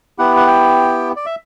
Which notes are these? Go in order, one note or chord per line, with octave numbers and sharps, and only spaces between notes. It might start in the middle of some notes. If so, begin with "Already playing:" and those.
B3 E4 G4 F#5
F#5
G5
D5
E5